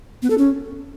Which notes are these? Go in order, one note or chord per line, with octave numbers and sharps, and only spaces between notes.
B3
A4
C#4